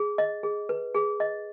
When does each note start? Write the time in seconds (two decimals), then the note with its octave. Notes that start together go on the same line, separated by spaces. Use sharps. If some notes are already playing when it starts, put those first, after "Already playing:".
Already playing: G#4
0.18 D#5
0.43 G#4
0.69 B4
0.94 G#4
1.20 D#5